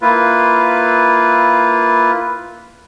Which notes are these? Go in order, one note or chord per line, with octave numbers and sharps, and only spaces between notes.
A#3 E4 F4 B4